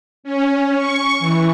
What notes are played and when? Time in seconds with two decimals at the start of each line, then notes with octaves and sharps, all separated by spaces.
0.24 C#4
0.76 C#6
1.19 E3